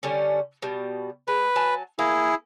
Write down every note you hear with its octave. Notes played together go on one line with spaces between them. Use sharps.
D3 G3 C#4
B2 G3
G#3 B4
F#3 G#5 A5
A#3 E4 G#4